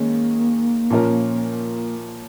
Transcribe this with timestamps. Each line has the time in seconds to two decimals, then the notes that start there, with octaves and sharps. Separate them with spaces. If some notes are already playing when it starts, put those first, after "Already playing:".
Already playing: D#3 G#3 A#3 C#4
0.91 A#2 F3 C#4 F4 A#4